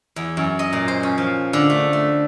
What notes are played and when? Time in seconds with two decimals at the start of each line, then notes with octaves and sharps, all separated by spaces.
0.16 E2
0.37 F#2
0.59 D#5
0.73 A#2
0.88 C5
1.03 C#4
1.18 F3
1.53 D3
1.70 A3
1.93 A3